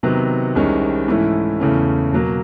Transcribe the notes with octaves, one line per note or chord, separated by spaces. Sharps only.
C3 D#3 F#3 B3
C2 C3 D#3 G#3 C#4
G#2 E3 A3 C#4 E4
E2 C#3 E3 A3 C#4
B2 F#3 A#3